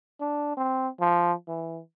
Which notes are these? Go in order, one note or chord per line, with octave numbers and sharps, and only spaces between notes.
D4
C4
F3
E3